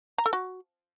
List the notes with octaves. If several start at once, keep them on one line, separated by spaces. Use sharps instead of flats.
A#5
A4
F#4